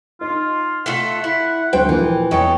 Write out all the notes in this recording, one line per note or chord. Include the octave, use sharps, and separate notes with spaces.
D#4 F4
A3 F4 A4 F#5
E4
D2 F#3 C5 G5
A#2 E3 F3 A#3
E2 A4 B4 C#5 D#5 G5